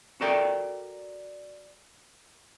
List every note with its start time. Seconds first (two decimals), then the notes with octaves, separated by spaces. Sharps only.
0.21 F#4 A4 A#4 D5 G5